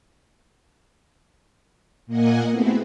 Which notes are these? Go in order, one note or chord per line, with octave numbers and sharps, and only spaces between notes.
A#2 A#3 D#5 F#5 G#5
A3 B3 C4 E4 F#4 G#4